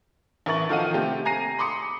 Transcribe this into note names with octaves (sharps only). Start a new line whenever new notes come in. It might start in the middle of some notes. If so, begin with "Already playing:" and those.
A1 E3 A#4 C#6 A6 F#7
D#3 F3 A4 F5 F#5 D#7
C3 A3 C4 G4
G#5 A#5 A#6 C7 D#7
B5 C6 D6 D#6 C#7